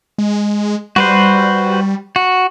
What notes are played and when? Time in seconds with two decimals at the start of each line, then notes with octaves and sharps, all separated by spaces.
0.18 G#3
0.96 G3 F#4 B4 C5
2.16 F#4